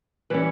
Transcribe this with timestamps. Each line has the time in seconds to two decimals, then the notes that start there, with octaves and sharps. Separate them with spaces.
0.30 E3 G3 C#4 B4